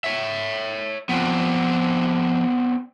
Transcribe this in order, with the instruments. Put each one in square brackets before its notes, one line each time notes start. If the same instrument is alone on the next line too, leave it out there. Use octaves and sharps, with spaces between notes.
[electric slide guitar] C#5 E5
[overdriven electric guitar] F2 F3 [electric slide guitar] B3 C4 D4